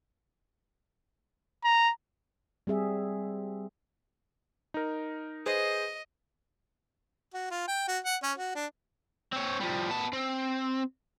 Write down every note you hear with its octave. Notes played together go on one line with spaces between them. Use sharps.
A#5
G3 C4 G#4 E5
D#4 A#4
G#4 B4 C5 D#5
F#4
F4
G5
F#4
F#5
C#4
F#4
D4
C4 C#5
F3 G3
B3 A5
C4